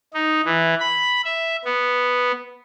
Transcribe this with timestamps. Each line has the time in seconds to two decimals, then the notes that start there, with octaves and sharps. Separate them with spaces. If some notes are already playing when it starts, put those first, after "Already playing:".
0.14 D#4
0.45 E3
0.80 B5
1.25 E5
1.65 B3